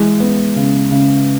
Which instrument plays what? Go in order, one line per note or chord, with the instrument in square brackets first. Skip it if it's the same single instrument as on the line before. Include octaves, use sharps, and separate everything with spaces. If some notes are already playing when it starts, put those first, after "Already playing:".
Already playing: [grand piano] E3 [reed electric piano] G#3
[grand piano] B3
C#3
C#3